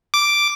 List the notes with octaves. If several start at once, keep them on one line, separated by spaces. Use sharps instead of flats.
D6